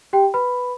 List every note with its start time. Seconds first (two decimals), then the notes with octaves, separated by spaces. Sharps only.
0.13 G4 G5
0.34 B4 B5